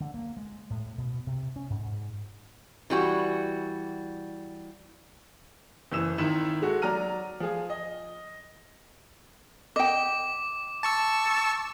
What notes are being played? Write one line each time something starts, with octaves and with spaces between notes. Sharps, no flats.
D3
A#3
G#3
A2
B2
C3
C#4
G#2
E3 G3 F#4
F#1 E3 E6 E7
G#1 D#3 E4 E7
G#3 F#4 A4
F#3 D5 A#5 F6 D#7
F3 G#4
D#5
D#5 G5 D6
A5 C#6 E6